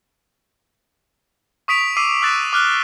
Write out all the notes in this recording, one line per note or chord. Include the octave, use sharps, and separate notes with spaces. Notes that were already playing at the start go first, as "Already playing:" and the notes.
C#6 D#6 B6 D7 F7
D6 E6 C7 D#7
D6 E6 F#6 A6 B6 E7
D6 F6 F#6 G7